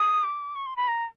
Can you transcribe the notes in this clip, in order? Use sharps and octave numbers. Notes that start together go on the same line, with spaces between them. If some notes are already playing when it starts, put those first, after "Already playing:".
Already playing: D#6
D6
C#6
C6
B5
A#5